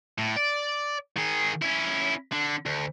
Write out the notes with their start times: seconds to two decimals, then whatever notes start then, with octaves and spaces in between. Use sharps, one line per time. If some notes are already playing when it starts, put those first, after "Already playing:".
0.18 A2
0.36 D5
1.16 D#3 G#4
1.62 C#4 E4
2.32 D3
2.66 D2